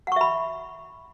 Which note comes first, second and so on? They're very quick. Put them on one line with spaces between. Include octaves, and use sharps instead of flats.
F#5 C#6 E5 B5